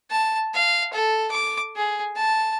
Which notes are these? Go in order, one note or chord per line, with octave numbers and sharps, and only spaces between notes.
A5
F5
A4
D6
G#4
A5